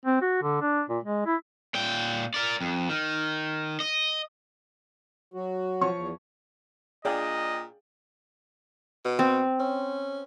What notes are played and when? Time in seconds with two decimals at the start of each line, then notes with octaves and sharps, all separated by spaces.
0.06 C4
0.22 F#4
0.42 D3
0.61 D4
0.89 A#2
1.04 G#3
1.26 E4
1.74 A#2 G5
2.34 A#4 D5
2.61 F2
2.89 D#3
3.80 D#5
5.34 F#3 F#4
5.81 F3 C#5 C#6
5.95 E2
7.05 A#2 D4 G#4 D5 D#5 F5 G5 D#6
9.05 B2
9.19 C4
9.60 C#4